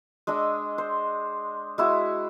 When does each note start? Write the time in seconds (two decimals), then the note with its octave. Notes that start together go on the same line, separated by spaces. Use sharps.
0.27 G#3 D4 D#5 E6
0.78 C5
1.78 G#3 E4 F#4